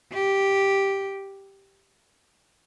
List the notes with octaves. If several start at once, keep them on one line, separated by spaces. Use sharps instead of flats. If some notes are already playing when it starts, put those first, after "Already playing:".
G4